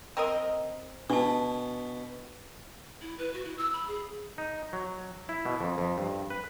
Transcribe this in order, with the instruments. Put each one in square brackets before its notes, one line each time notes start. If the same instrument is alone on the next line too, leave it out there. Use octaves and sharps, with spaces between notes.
[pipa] C4 A#4 D#5
[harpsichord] B2 [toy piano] D4 A5
[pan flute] E4
B4
F#4
E4
E6
B5
G#4
[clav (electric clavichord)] D#4
F#3
E4
B2
F2
F2
G2
B4